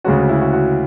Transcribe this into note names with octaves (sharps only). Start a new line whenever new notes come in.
D2 C#3 G#3 C#4 F#4
E4
F#4
F#4